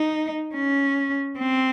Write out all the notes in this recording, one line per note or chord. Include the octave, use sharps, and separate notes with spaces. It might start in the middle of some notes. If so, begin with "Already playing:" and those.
Already playing: D#4
C#4
C4